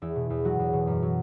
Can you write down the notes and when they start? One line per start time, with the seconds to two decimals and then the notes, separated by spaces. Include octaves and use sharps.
0.02 E2 E4
0.16 B2
0.30 E2
0.44 F#3 F#4
0.59 E2
0.73 B2
0.87 F#2
1.02 F#3